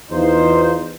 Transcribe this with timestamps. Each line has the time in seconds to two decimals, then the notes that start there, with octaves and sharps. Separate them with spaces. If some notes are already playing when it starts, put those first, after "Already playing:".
0.11 E2 D#4 F4 C5